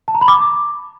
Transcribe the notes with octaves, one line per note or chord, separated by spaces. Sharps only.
A5
A#5
B5
D6